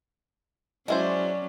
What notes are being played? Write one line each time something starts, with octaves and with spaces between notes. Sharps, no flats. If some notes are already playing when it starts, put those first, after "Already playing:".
F#3 G#3 C#4 D4 E4 C5